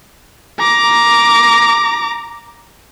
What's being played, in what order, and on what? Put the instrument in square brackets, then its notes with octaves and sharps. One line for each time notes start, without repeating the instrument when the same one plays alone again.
[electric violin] A#5 D6